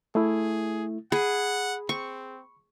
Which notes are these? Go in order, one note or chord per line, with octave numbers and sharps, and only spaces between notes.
A3 E4 G#4
G#4 F#5 B5
C4 C#6